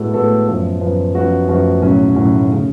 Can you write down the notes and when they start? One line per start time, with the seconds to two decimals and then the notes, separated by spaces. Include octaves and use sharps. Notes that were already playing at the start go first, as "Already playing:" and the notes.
Already playing: A2 G#3 B3 F#4 A4
0.14 A2 G#3 B3 F#4 A4
0.47 F#2 F3 B3
0.81 F#2 F3 B3
1.15 F#2 F3 B3 F#4
1.48 F#2 F3 B3 F#4
1.82 B1 A2 F#3 C#4 F#4
2.15 B1 A2 F#3 C#4 F#4
2.52 C#3